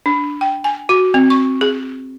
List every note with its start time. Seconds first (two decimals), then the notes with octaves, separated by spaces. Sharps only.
0.06 D4
0.41 G5
0.64 G#5
0.89 F#4
1.14 C4
1.30 C#6
1.61 G#4